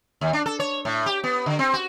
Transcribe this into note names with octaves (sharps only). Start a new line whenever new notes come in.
D#2
D4
A4
C#5
A2
G4
B3
D3
C4
F#4